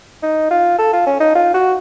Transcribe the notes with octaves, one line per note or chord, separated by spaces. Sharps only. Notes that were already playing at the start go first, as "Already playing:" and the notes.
D#4
F4
A4
F4
C#4
D#4
F4
F#4